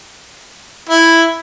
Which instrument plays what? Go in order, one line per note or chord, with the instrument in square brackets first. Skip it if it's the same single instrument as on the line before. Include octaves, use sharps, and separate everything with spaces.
[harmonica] E4